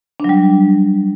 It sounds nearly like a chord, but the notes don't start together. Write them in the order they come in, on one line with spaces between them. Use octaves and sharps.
D4 F#3 G3